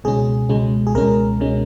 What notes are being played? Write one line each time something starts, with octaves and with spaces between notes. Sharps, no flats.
C#2 B2 G#3 C#4 G#4
C#2 B2 G#3 C#4
G#4
C#2 B2 G#3 C#4 A#4
B2 G#3 C#4